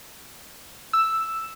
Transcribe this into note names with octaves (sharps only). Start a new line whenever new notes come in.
E6